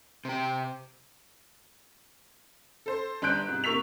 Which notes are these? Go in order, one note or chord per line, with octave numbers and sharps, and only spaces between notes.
C3 G4
A4 C5
G1 D4 C6 F#6 G6 D7
G#2 C3
C3 A#3 C#6 E6 B6 F7